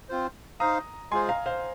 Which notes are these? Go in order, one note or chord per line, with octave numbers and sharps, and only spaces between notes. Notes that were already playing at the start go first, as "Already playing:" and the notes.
C4 F4 C5
D#4 C5 F5 A#5 D#6
G#3 F4 G#4 C5 G#5 C6
F5 A#5
C5 F5